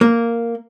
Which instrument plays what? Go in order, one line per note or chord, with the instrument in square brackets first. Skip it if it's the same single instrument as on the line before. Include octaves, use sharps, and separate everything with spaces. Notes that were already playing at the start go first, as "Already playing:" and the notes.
[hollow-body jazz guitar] A#3